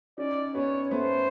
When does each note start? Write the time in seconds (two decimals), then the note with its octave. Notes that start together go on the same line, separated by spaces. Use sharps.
0.18 C#4 D#4 D5
0.54 B3 C#4 C#5
0.91 A3 B3 C5